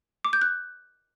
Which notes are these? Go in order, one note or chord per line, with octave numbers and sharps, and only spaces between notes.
D6
G6
F#6